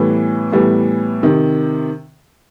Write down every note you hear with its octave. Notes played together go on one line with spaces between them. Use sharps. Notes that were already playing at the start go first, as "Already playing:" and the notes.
Already playing: A2 E3 G3 B3
A2 E3 G3 B3
C3 D#3